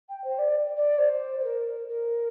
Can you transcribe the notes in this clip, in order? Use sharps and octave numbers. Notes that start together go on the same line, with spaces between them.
G5
C5
D5
D5
C5
C5
A#4
A#4